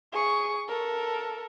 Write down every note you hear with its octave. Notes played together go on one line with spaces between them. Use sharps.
G#4 C#6
A4 A#4